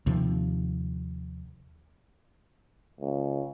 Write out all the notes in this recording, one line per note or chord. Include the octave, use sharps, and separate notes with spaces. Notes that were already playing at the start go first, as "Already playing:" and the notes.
D#2 C3 F3
C#2